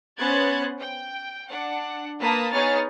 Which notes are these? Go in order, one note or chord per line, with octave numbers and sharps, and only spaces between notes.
B3 C#4 C5 F#6 G#6 A6
G5
D4 F#5
A#3 B4 A5 D#6 B6
B3 D#4 G#4 C#5 F6 A6